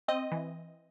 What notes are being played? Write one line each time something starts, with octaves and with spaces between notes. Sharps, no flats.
C4 D#5
E3